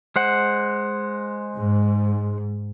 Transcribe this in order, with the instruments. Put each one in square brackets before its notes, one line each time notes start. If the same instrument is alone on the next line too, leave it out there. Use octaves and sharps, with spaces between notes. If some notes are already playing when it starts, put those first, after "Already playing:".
[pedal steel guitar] G#3 C5 F#5
[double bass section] G#2